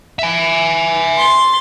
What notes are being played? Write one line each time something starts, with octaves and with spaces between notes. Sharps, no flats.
E5 G#5
C6 A6